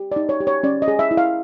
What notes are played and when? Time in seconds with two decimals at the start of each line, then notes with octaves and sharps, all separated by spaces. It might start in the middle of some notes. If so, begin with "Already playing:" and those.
Already playing: G4
0.12 D#4 D5
0.29 C#5
0.40 G4
0.47 C#5
0.63 C#4 D5
0.82 D#5
0.88 G#4
0.99 E5
1.11 E4
1.17 F5